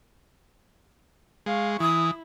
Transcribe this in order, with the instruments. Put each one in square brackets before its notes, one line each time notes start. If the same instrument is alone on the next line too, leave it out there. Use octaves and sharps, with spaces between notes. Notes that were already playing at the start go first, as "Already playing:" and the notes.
[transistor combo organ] G#3 [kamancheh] F5 C#6
[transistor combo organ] E3 [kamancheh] E4 [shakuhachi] D#6